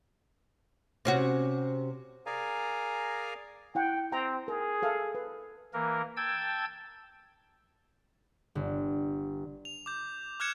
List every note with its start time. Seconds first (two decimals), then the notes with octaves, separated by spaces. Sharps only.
1.05 C3 C#4 F#4
2.26 G#4 A#4 D5 F5 G#5 A#5
3.75 E4 F#5 G5
4.12 C4 G5 A#5
4.48 G#4 A#4
4.82 A4 E5 F5
5.15 B4
5.74 E3 A#3 A#4
6.17 G5 A5 E6 G#6
8.55 G1
9.65 F7
9.86 D6 G6
10.40 D6 F6 F#6 G#6 C#7 E7